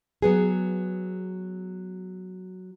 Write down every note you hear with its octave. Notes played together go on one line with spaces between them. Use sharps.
F#3 B3 G#4